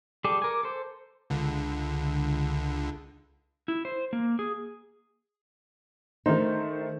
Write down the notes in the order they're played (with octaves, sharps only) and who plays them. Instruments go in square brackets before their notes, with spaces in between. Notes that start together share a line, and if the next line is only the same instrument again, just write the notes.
[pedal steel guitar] G3 G#4 A4 [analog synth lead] D6
[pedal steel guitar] A#4 G#5
A4 C5
[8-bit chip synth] C#2 D3
[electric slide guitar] E4
C5
A#3
G#4
[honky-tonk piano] D#3 A3 C5 [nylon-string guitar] D#4